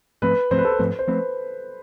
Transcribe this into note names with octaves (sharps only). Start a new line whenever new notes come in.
G#2 F3 A3 C4 B4
G#2 F3 A3 C4 C5
B4
A4
B4
G#2 F3 A3 C4
C5
F3 A3 C4 B4